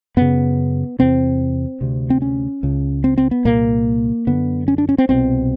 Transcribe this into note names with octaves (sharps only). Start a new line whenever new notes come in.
F#2 C#3 B3
E2 C3 C4
D2 C3
C4
C#4
C#2 C#3
C4
C4
B3
C2 A#2 A#3
F#2 D3 B3
C#4
D4
C#4
C4
C2 B2 C4